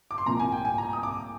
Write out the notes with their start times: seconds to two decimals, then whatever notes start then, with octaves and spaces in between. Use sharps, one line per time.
0.11 D6
0.18 C6
0.26 C2 A#2 F3 A#5
0.39 G#5
0.52 G5
0.65 G#5
0.78 A#5
0.93 D#6
1.03 D6